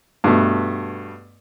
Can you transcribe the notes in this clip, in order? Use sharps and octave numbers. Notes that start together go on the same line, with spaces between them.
G2 B2 A3